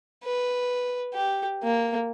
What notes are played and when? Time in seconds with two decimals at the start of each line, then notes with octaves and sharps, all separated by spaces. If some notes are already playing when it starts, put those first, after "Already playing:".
0.24 B4
1.14 G4
1.64 A#3